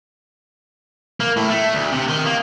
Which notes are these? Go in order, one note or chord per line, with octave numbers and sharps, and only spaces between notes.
A#3
A2
A3
D2
C3
D#3
A#3